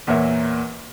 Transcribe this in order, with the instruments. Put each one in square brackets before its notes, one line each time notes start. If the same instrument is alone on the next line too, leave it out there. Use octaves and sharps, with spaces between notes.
[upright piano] E2 A#2 A#4 C#5 E5